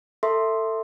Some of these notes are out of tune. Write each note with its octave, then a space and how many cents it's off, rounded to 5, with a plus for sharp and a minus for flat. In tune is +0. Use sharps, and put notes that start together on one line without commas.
A4 +25 E5 +0 C6 +0